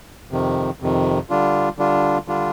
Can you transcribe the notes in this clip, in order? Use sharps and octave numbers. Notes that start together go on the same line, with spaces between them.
F2 C3 D#3
F2 C3 D#3
D3 G3 D4 F4
D3 G3 D4 F4
D3 G3 D4 F4